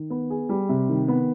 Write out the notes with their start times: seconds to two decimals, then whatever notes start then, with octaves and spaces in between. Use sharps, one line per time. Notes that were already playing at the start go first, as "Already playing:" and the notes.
Already playing: D#3
0.10 B3
0.30 G#4
0.49 G3
0.69 C3
0.89 D#3
1.08 B3